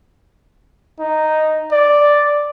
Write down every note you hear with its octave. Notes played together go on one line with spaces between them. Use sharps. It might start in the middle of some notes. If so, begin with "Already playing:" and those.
D#4
D5